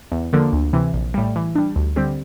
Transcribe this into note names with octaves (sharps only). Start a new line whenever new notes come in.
E2
D3 F3 A#3
D2
C3 E3
A#1
A2 G3
E3
G3 D4
D2
D3 G3 C4 G4